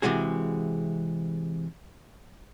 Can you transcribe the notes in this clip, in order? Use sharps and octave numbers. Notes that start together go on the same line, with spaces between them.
C3 E3 G#3 F#4 G#4